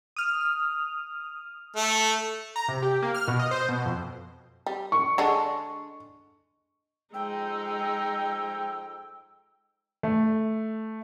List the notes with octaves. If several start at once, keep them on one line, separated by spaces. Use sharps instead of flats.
D#6 F6
A3
A#5
C3
G4
A#3
F6
B2
D#5
C5
B2
F2
G3
C#6
D3 G#3 D4
F2 G#3 D#4 G5 E6
A3